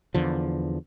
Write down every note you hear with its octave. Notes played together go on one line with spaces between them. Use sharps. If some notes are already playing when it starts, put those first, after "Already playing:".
E2 D3 F3